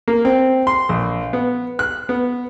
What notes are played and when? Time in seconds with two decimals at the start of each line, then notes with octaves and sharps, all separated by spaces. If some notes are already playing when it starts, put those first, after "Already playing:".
0.08 A#3
0.25 C4
0.67 C6
0.89 A#1
1.33 B3
1.79 F#6
2.09 B3